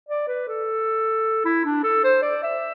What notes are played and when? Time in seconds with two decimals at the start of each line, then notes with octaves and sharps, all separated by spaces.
0.09 D5
0.28 B4
0.48 A4
1.45 E4
1.65 D4
1.84 A4
2.04 C5
2.22 D5
2.43 E5